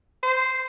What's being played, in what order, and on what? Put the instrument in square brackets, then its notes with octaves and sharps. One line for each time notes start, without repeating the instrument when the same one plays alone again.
[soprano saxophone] C5